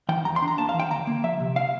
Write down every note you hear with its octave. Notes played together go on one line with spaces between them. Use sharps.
E3 G5
E2 A#5
C6
D4
A#5
A#3 A5
F5
E3
G5
D2 A#5
A#3
F3 E5
C3
F5